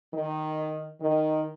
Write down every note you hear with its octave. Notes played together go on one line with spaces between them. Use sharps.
D#3
D#3